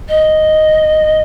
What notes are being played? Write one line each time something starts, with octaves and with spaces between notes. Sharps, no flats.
D#5